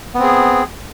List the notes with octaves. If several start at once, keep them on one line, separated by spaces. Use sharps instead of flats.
B3 C4 G#4